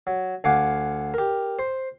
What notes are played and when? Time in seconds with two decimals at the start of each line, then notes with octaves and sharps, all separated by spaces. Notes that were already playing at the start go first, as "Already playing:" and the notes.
0.07 F#3
0.44 D2 F5 F#5 G#5 D6
1.14 G4 A#4
1.59 C5